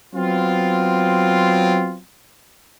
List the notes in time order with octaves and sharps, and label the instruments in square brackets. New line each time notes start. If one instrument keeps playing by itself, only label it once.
[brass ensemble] F#3 B3 C4 F4